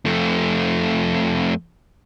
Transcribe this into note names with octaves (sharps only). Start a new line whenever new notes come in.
F2 A3